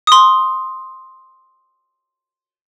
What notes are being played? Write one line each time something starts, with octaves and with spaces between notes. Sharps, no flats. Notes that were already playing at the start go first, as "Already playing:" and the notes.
C6 D#6